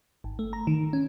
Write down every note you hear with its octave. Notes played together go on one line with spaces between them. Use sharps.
G#1
A3
A#5
D#3
C#4